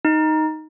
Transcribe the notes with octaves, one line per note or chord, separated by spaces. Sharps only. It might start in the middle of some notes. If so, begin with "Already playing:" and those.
D#4